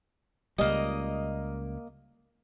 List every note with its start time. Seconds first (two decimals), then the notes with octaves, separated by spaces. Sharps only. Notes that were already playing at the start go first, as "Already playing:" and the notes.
0.58 C#2 G3 A#3 D#5